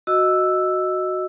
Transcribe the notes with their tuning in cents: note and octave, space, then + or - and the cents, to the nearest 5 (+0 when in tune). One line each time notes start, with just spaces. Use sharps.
F#4 +0 D#5 +0 E6 +0